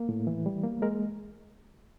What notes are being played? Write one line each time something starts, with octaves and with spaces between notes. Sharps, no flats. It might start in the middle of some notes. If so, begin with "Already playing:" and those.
Already playing: A#3
A2
E3
G3
A#3
G#3 A#4